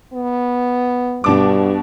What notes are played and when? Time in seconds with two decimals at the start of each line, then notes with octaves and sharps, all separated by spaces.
0.13 B3
1.24 G2 B2 D4 D6